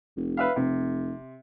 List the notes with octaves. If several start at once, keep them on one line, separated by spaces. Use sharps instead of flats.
F1
B4 E5 F5
F1 C3